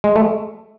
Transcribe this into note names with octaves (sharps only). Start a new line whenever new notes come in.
G#3
A3